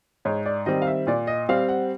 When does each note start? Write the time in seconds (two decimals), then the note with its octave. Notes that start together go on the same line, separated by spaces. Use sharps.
0.25 G#2 C#5
0.46 D5
0.66 D#3 G3 C4 D#5
0.82 F5
0.87 E5
1.07 A#2 D5
1.27 D#5
1.49 G3 C4 F5
1.69 F#5